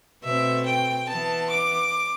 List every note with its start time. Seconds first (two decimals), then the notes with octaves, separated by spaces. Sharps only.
0.24 B2 A3 C4 E5
0.66 G5
1.09 E3 B3 A5
1.50 D6